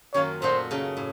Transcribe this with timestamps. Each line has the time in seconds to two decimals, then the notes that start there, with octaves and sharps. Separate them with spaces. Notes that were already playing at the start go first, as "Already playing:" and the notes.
0.14 F#2 D#3 A#3 F4 C#5
0.42 A#2 A3 D#4 F#4 C5
0.71 C#3 A3 D#4
0.97 A2